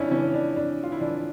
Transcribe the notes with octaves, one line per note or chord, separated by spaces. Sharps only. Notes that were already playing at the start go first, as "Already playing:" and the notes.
Already playing: F2 C#4 D4 E4
E3 C#4
D4
F2 D4
F4
E4
E3 D4